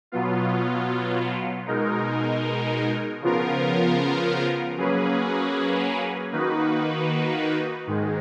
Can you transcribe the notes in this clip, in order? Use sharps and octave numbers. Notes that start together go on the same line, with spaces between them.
B2 F#3 B3 F4
B2 G#3 D#4 A#4
C#3 F3 B3 F4 A#4
F#3 A#3 C#4 G#4 B4
D#3 A#3 D#4 F#4 B4
G#2 D#3 G#3